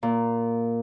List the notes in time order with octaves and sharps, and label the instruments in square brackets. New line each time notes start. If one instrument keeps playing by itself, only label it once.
[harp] A#2